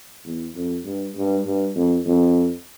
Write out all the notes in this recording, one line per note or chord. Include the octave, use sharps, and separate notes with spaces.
E2
F2
G2
G2
G2
F2
F2